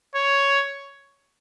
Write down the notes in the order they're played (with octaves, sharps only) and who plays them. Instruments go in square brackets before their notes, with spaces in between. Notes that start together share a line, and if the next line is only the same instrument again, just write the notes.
[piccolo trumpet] C#5